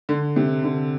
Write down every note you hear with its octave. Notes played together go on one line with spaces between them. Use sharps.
D3
C3
D3